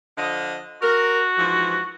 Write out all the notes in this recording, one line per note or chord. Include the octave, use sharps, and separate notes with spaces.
D3 F3 D#5
F#4 A#4
G#2 E3 F3